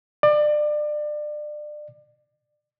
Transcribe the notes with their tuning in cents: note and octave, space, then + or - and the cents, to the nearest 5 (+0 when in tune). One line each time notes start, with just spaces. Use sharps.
D5 +30